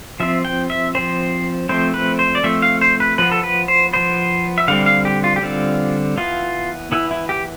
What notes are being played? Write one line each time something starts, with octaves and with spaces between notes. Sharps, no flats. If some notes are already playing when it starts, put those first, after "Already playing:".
F3 C4 E5
G5
E5
F3 C4 C5
F3 A3 C4 C5
B4
C5
D5
F3 A3 C4 E5
F5
C5
B4
F3 B3 B4
A4
B4
C5
F3 B3 C5
E5
D3 G3 C4 F5
F5
G4
F4
G4
D3 G3 C4 F4
E3 B3 F4
E3 B3 E4
E4
G4